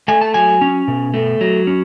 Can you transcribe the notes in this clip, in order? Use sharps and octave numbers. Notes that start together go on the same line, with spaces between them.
A3 G#5
A5
F#3 G#5
C#4
B2
A3
F#3
C#4